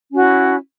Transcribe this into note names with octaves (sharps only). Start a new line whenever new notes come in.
C#4 E4 F#4